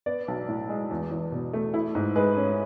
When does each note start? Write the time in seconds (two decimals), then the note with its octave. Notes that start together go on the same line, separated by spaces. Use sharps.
0.06 B3 D5
0.28 B1
0.48 A2
0.69 G#3
0.91 E2
1.11 E2
1.32 B2
1.53 A3
1.74 E4
1.95 G#2
2.15 G#3 B4
2.37 C#4